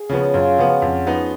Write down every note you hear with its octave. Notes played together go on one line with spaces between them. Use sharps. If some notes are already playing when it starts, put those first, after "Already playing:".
Already playing: G#4
C#3 F3 B3 C#4
F#2 F4
C#3 F3 B3 F#4
F2
F3 B3 D#4